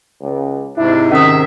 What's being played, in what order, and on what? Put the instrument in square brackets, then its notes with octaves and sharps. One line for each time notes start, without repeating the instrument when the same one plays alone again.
[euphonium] C#2
[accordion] G#2 C3 [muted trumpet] D4 [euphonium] E4
[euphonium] D#3 [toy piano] C#4 D#6 [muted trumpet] E5